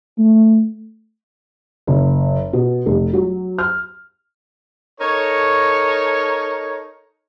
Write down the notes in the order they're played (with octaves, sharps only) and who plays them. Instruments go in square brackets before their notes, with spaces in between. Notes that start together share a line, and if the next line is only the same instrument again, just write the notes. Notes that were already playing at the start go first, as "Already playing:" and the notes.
[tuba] A3
[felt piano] F#1
B2
F1
F#3
F6
[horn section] D#4 A4 A#4 C#5